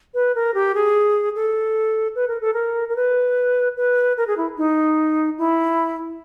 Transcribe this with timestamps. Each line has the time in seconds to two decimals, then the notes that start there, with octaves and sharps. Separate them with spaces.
0.14 B4
0.35 A#4
0.54 G4
0.75 G#4
1.35 A4
2.15 B4
2.28 A#4
2.41 A4
2.54 A#4
2.89 A#4
2.96 B4
3.77 B4
4.17 A#4
4.27 G#4
4.37 E4
4.57 D#4
5.38 E4